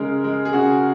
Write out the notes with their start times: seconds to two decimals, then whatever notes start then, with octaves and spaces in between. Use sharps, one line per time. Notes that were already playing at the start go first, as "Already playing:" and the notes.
Already playing: C#3 G#3 A#4
0.24 G#3
0.45 G#4
0.53 C#3 F#4